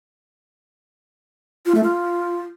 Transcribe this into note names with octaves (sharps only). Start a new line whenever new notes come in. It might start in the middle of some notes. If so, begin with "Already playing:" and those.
F4
A3
F4